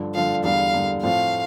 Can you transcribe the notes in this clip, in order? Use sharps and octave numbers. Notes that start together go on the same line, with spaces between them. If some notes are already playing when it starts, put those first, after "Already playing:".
Already playing: G2 D3 F3
G2 D3 F3 F5
E2 D3 G3 F5
E2 D3 G3
A2 F3 C4 F4 F5